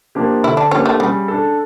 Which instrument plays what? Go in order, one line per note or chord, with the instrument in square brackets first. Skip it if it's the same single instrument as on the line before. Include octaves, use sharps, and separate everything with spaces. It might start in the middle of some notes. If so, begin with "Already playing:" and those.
[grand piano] F3 A#3 D4 G4
[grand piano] D3 [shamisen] E4
[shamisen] D4
[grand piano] F3 A#3 D4 G4 [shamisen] C#4
[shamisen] A3
[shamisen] C#3 [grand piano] G3
[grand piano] D4 A4